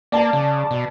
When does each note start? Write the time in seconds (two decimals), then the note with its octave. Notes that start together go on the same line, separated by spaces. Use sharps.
0.12 A#3 D5 A5
0.33 C#3
0.71 B2